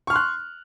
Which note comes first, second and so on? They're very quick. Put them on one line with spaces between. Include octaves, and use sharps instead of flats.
C#6 F6 C6 F#6